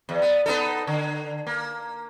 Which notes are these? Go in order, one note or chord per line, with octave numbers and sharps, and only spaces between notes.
E2
B3
B3 D#4 A4
D3
A#3